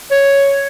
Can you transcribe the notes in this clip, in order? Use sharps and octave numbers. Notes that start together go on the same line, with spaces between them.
C#5